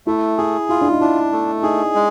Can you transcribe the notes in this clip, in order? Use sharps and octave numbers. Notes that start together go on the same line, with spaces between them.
A3 E4
E4 G#4
E4 F4
D4
D#4
D4 E4
A3
D#4 G#4
G#3